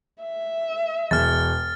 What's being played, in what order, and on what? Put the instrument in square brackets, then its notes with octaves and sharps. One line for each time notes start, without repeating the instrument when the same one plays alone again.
[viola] E5
[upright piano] E1 [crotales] F6 A6